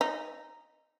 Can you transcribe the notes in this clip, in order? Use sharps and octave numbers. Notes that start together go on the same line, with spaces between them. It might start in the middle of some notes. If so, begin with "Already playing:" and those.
D#4